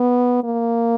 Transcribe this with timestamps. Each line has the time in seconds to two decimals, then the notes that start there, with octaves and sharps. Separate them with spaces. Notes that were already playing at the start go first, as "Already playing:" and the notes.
Already playing: B3
0.44 A#3